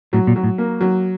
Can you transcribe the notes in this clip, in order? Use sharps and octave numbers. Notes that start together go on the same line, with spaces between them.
A2 F#3
A#2
F#3
A2
A#3
F#3